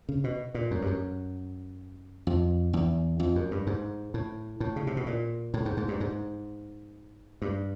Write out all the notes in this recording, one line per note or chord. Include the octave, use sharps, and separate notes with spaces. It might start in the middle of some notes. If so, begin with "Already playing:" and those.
C#3
B2
A#2
F#2
G2
F#2
F2
E2
F2
F#2
G2
G#2
A2
A2
C#3
C3
B2
A#2
A2
G#2
G#2
G2
G#2
G2